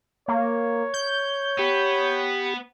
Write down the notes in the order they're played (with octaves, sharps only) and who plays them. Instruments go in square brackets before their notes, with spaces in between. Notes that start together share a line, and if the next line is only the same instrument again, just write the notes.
[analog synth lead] A#3 [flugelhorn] C#5
[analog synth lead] G6
[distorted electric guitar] B3 [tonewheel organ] G4